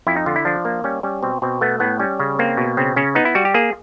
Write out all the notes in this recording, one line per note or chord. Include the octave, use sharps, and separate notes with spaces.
F2 E4
D#4
D3 F4
E4
F3 D4
A#3
G3 C#4
G3 C#4
B2 C4
B2 C4
A3 B3
A2 B3
G3 C#4
C#3
A#3 C4
B2
C#3 C4
C#3 C#4
B3 D#4
E4
G3 F#4
G4
A#3 G#4